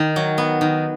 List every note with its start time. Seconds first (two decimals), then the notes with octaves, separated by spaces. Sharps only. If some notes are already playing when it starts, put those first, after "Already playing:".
Already playing: D#3
0.16 F#3
0.38 B3
0.61 D#3